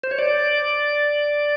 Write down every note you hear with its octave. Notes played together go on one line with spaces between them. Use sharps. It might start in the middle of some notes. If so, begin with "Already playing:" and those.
C5
C#5
D5